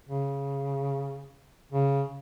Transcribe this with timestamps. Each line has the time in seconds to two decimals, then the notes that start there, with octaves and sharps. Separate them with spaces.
0.09 C#3
1.72 C#3